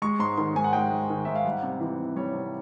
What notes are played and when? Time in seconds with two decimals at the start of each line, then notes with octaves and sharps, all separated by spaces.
0.02 G#3 C#6
0.19 G#2 C6
0.37 D#3 C6
0.55 G#2 G#5
0.64 F#5
0.73 G#3 G5
0.91 G#2
1.10 D#3
1.25 G#2 E5
1.36 F5
1.45 G3 F#5
1.63 C3
1.80 E3
1.99 C3
2.16 G3 C#5
2.34 C3